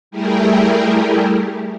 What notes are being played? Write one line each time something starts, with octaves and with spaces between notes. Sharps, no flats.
G3 A3 E4 G4 G#4 A#4